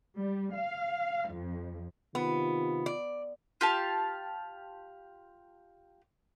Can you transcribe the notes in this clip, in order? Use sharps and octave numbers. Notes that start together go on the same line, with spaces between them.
G3
F5
F2
C3 D#3 B3 F4
D5
F4 G4 F5 A5